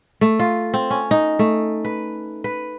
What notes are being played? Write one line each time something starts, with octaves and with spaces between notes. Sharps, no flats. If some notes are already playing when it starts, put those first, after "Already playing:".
A3
F4
C4
C#4
D#4
A3
B4
B4